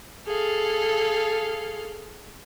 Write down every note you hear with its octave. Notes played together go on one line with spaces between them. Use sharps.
G#4 A4 F5